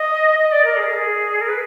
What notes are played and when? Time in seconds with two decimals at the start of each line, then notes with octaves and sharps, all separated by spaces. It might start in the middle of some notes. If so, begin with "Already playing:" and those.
Already playing: D#5
0.39 D#5
0.52 D5
0.65 A#4
0.77 G#4
0.90 A#4
0.94 G#4
1.41 A#4
1.48 B4